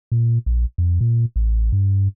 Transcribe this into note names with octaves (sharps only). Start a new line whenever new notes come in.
A#2
A#1
F2
A#2
A1
G2